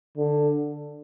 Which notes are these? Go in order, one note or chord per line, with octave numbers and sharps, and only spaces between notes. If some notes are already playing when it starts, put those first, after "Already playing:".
D3